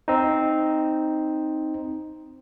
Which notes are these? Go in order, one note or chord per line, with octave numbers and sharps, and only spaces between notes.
C4 D#4